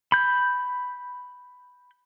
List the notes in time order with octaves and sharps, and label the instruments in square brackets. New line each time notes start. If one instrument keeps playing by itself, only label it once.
[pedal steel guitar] B5 G6